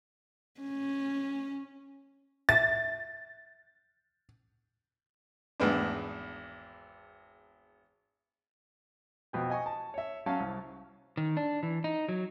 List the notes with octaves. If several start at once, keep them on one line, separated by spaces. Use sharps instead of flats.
C#4
E5 A6
G#1 E2 B3 D4
F2 B2 G5
D#5 G#5 C#6
A5
C#5 E5
F#3 C#4 F5 A5
C2
D#3
D4
E3
D#4
F#3